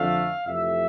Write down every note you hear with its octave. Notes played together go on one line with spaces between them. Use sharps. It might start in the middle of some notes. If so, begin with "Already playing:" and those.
Already playing: F2 D3 F3 A3 F5
F2 C3 E3 A3 E5